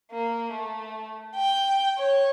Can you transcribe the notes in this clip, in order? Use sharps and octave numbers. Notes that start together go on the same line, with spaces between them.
A#3
A3
G5
C#5